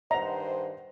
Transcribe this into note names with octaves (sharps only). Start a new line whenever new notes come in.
G2 D#3 C5 D#5 F#5 A#5